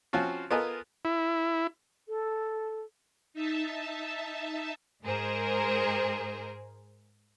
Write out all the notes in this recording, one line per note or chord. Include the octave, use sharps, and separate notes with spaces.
F3 C4 C#4 F4 F#4
B3 F4 A4 A#4 D#5 G#5
E4
A4
D#4 E5 A5
G#2 G#4 A#4 C5